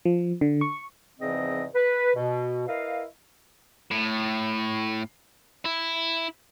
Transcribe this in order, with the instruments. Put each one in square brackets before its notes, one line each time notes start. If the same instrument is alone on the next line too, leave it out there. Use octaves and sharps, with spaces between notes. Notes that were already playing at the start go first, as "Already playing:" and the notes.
[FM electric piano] F3
D3
C#6
[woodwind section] E2 G#2 C#3 F3 C4 D#5
B4
B2
E4 A#4 B4 D#5 F5
[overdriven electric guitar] A2
E4